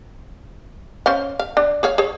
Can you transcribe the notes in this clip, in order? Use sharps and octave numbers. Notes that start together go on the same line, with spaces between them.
C#4 C5 F5
F5
D4
G#4 C#5 F5
G#4 C#5